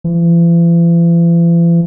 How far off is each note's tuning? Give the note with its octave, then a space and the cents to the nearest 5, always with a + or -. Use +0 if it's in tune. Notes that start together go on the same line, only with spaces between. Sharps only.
E3 +45